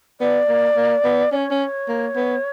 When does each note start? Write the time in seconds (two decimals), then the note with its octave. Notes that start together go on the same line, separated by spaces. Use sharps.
0.20 B3 D5
0.49 A#3
0.76 A#3
1.04 B3
1.32 C#4 C#5 D5
1.51 C#4
1.88 A#3
2.16 B3